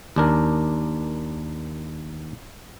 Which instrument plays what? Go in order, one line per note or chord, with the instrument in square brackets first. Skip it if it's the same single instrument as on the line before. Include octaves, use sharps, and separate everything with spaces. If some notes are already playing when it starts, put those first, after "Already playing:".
[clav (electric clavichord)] D#2 D4 A#4